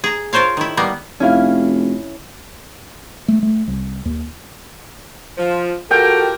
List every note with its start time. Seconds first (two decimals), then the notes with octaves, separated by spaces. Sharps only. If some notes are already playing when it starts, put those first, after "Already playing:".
0.04 G#4 A#5
0.33 F4 A#4 C5 C#5 F5
0.57 D#3 E4
0.77 G3 A#3 B3
1.20 F1 C#4 E4 F5
3.28 A3
3.43 A3
3.68 C2
4.05 D#2
5.38 F3
5.91 F3 F#4 G4 A4 A#4 G5